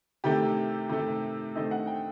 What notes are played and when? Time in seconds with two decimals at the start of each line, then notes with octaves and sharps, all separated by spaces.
0.24 C3 D#3 A3 G4
0.89 C3 D#3 A3
1.56 D#3 A3 C4 D#5
1.71 F#5
1.87 G5